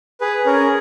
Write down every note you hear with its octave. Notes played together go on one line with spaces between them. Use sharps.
G#4 B4
C#4 A#4